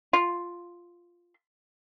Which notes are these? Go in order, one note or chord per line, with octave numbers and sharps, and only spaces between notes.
F4